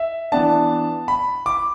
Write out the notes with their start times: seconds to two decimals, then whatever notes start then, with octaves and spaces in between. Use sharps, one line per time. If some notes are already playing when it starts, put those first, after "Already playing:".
Already playing: E5
0.32 E3 B3 D4 A5
1.08 B5
1.46 D6